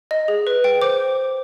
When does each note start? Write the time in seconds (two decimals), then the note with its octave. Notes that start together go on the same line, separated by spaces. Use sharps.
0.11 D#5
0.28 G#4
0.47 B4
0.64 G5
0.82 C5 D6